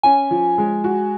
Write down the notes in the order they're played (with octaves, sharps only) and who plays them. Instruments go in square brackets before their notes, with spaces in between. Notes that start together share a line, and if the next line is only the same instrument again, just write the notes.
[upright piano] C#4 [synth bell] G#5
[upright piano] F3
G#3
F#4